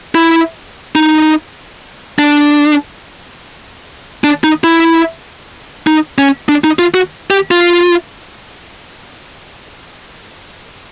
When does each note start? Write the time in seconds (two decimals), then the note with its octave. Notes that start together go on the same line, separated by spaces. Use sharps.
0.15 E4
0.95 D#4
2.19 D4
4.24 D4
4.44 D#4
4.64 E4
5.87 D#4
6.18 C#4
6.49 D4
6.64 D#4
6.79 F4
6.94 F#4
7.30 G4
7.51 F4